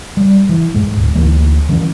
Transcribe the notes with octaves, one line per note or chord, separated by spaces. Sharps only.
G3
E3
G#2 G#3
D1
D2 E3 A#3
D#3 E3 B3 C#4